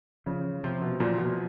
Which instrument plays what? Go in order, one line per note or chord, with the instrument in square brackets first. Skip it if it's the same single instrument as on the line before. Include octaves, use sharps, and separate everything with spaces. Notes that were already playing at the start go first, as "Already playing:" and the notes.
[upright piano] C#3 [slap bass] F3
[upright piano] C3 [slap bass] F3
[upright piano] B2
[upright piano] A#2 [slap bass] F3
[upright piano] B2